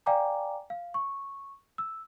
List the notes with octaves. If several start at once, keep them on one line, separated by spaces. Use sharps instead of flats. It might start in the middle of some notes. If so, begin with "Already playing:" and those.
D5 F5 G5 G#5 A#5 D6
F5
C#6
E6